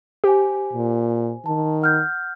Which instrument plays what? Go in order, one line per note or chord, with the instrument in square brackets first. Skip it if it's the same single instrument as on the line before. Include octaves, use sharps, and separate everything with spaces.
[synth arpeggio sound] G4 [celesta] C5 G#5
[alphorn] A#2
[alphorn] D#3 [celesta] A5
[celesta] F#5 F6 G6